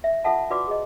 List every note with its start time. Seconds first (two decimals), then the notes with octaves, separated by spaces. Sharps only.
0.04 E5
0.24 F4 A4 E5 F#5 A5
0.50 F4 F#4 B4 D5 D6
0.67 G#4 D#5